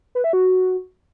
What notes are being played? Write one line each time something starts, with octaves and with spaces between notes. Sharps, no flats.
B4
E5
F#4